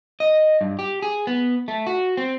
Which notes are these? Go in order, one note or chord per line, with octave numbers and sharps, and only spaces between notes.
D#5
G2
G4
G#4
B3
A3
F#4
C4